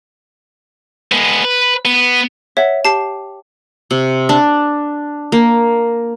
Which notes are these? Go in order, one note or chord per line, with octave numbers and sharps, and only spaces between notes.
G#3 B3
B4
B3
C#5 E5 F#5
G4 A5 C7
C3
D4
A#3